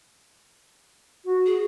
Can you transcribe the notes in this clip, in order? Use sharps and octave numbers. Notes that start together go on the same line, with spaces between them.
F#4
G#4